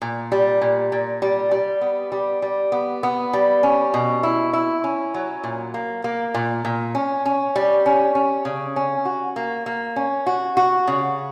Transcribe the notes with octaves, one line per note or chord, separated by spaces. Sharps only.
A#2
G3
A#2
A#2
G3
G3
B3
G3
G3
B3
B3
G3
C#4
B2
E4
E4
C#4
F#3
A#2
A#3
A#3
A#2
A#2
C#4
C#4
G3
C#4
C#4
C#3
C#4
F#4
A#3
A#3
C#4
F#4
F#4
C#3